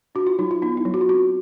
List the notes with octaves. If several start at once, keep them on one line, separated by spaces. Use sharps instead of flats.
D4 F#4
F4
F#3 D#4
F4
B3 D#4
E4
F#3
F#4
F4
C4 F#4